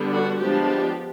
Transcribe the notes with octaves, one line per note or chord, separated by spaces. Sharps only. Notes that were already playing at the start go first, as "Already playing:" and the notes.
Already playing: D3 G3 B3 D4
F#4
F3 G#3 B3 D4 G4
G4